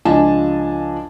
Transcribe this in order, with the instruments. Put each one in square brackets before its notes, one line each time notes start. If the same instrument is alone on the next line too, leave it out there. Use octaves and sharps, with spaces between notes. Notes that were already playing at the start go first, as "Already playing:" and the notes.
[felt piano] C#2 F3 D4 D#5 G#5 A5